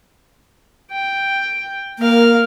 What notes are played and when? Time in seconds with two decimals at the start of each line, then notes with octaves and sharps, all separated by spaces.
0.91 G5
1.99 A#3 A#4 F5